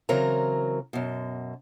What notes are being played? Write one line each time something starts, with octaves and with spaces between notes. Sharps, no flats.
C#3 E3 F#3 C4 A#4 A#5
F#2 B2